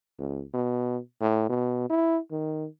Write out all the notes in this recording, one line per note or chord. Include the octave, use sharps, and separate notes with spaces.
C#2
B2
A2
B2
E4
D#3